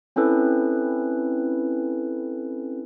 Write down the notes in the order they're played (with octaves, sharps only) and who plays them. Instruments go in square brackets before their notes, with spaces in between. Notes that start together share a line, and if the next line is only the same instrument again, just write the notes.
[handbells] C4 C#4 E4 A4 B4